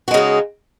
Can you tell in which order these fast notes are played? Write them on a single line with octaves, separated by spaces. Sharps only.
F#4 G#3 C#3 D#4